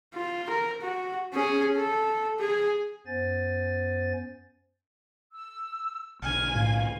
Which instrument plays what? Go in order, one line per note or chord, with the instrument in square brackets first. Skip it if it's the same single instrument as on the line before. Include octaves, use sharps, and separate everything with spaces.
[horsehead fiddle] F4
A#4
F#4
C#4 G#4
A4
G#4
[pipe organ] F#2 B3 C5 G#5 A6
[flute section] E6
[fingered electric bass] B1 D3 [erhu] G#5 [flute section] F6
[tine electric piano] A2 [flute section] F5